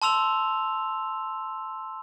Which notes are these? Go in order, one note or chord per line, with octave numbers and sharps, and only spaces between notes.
A5 C6 E6 F7